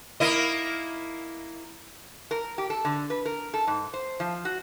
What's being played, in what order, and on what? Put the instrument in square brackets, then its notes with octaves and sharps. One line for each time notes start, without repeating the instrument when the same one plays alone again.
[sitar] A#3 E4 D#5
[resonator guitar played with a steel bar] A#4
G4
A4
D3
B4
A#4
A4
G#2
C5
F3
F#4